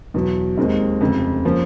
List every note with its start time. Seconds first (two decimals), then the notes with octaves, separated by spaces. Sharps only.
0.14 E2 B2 F#3
0.57 D#2 D#3 G#3 C4 D#4
1.01 F1 F2 C#3
1.45 F3 A#3 C#4